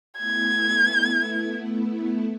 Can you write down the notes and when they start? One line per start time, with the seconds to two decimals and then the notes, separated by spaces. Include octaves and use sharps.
0.18 A3 B3 E4 G#6